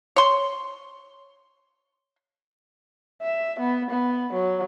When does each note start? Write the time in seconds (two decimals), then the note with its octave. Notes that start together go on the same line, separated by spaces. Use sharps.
0.16 C#5 C6
3.22 E5
3.60 B3
3.91 B3
4.33 F#3